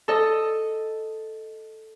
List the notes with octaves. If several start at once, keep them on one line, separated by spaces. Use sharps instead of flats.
A4 D#5